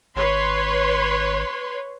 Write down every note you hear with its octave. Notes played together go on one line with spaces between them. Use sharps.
G#1 B4 C#5 C6